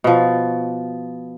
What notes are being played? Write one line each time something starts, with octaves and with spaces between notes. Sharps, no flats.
B2 F3